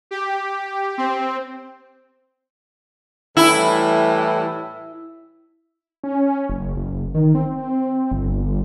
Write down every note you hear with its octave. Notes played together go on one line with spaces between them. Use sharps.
G4
C4
A2 E3 G3 E4
C#4
F#1
F#1
D#3
C4
G1